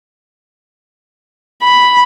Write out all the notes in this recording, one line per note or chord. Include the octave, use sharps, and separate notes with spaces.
B5